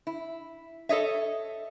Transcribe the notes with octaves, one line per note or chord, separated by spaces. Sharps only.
E4
A4 C#5 D#5 E5